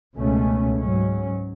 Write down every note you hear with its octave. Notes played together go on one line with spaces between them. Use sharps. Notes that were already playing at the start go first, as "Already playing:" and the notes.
C#2 B2 A3 C#4
G#2 F#3 C#4